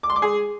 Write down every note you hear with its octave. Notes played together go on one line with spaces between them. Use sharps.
D6
C6
D6
G#4